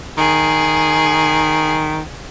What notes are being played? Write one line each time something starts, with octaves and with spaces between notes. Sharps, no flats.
D#3 G#4